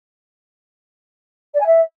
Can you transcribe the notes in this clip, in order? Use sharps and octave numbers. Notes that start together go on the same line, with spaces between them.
D5
G#5
E5